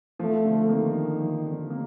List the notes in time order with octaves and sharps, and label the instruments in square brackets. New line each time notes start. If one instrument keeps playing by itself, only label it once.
[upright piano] F3 [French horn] A3
[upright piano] D3
[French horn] D#3 [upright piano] A#3
[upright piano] D3
F3
D3
A#3